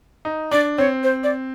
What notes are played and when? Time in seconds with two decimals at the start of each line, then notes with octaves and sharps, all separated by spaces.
0.25 D#4
0.51 D4 D5
0.78 C4 C#5
1.03 C5
1.24 D5